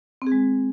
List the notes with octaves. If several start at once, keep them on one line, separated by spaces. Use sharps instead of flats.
C4
G#4
G#3